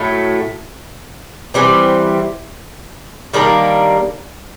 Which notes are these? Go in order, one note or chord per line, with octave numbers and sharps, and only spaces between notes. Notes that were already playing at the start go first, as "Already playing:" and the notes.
Already playing: A2 F#3 A3
E3 G3 C4
D#3 G3 A#3 D4